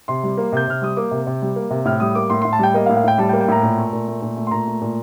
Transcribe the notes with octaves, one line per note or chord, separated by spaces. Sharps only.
C3 C6
G3
A#3
C3 G6
C3 F6
G3 D#6
A#3 D6
C3
C3
G3
A#3
C3
A2 F6
G3 D#6
A#3 D6
A2 C6
A2 C6
A5
G3 G5
A#3 D#5
F5
A2
F5
A2 G5
G3 A5
G5
A#3
G5
A2 A#5
A#2
A3
A#2
A3
A#2
A3
C6
A#2 A#5
A3
A#2